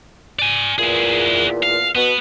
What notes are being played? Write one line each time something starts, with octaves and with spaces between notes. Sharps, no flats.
D5 G#5
E2 A#2 E4 G#4
F5
B2 B3